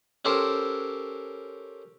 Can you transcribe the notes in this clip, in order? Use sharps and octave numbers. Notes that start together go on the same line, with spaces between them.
C#4 G4 A4 A#4 C5